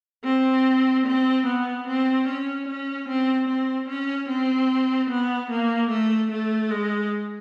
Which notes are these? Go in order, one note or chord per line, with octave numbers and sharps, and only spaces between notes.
C4
C4
B3
C4
C#4
C#4
C4
C4
C#4
C4
B3
A#3
A3
A3
G#3